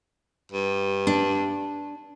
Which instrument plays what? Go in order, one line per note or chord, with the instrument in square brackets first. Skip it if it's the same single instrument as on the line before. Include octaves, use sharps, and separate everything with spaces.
[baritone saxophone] G2
[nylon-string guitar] D4